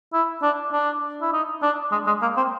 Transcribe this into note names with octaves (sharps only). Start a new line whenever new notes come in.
E4
D4
D4
E4
D#4
D4
G#3
G#3
A#3
C4